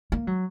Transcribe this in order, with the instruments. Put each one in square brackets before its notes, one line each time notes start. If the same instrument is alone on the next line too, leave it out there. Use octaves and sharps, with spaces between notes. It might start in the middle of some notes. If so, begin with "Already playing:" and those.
[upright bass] A#3
F#3